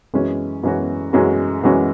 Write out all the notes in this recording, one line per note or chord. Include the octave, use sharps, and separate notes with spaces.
F#2 E3 G#3 C#4 F#4
F#2 E3 G#3 C#4 F#4
F#2 E3 G#3 C#4 F#4
F#2 E3 G#3 C#4 F#4